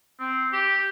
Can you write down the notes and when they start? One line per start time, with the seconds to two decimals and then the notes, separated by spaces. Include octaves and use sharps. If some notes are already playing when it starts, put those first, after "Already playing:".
0.20 C4
0.53 G4